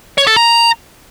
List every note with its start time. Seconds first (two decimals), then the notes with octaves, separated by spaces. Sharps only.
0.18 C#5
0.27 A4
0.36 A#5